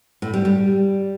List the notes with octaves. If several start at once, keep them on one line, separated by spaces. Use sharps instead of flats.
A2
G3
G3